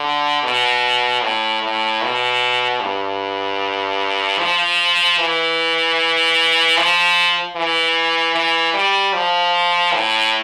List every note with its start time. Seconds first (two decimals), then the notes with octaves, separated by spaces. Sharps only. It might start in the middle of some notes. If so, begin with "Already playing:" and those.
Already playing: D3
0.43 B2
1.22 A2
1.62 A2
2.03 B2
2.81 G2
4.39 F3
5.18 E3
6.77 F3
7.56 E3
8.35 E3
8.74 G3
9.14 F3
9.94 A2